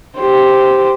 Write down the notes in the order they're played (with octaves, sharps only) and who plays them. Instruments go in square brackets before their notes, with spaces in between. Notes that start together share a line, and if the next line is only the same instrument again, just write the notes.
[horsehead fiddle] G4 C5